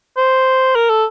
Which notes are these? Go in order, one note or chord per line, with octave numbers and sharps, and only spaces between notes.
C5
A#4
A4